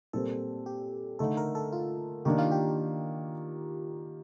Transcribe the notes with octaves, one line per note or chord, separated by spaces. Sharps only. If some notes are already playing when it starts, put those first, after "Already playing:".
A#2 G3 C4 A4
G4
D3 A3 D#4 A4
A#4
A4
F4
D#3 A#3 D4 G4
F4
G4